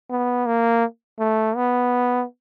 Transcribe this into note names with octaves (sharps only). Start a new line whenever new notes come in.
B3
A#3
A3
B3